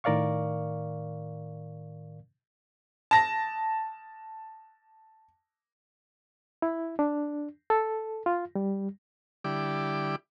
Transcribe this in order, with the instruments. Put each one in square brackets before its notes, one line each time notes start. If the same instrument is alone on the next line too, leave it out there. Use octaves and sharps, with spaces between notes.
[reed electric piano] A2 D#3 A#4 D5 F5 C#6
[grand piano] A5 A#6
[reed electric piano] E4
D4
A4
F4
G3
[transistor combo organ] D3 G3 E4 G4 D5 D6